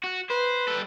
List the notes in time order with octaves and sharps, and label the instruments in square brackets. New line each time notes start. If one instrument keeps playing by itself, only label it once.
[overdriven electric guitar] F#4
[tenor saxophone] B4 [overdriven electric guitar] C5
[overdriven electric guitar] G3 A4